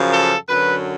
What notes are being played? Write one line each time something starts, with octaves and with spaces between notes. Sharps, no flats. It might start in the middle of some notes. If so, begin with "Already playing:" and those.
Already playing: F#2 C#3 F3
A4
F#2 D3 F#3 B4